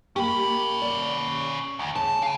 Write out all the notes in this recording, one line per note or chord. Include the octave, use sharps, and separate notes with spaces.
A#3 C#4 G4 B5
D5
D2
C#3 A5
F5 G#5